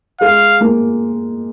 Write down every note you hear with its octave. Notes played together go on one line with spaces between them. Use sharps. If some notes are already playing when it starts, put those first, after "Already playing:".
G#3 F5
A#3